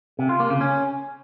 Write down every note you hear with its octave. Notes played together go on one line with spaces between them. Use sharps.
C3
F4
A#3
C#3
C#4